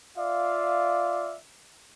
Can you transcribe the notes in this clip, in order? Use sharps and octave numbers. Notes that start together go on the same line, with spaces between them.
F4 D5 E5 F5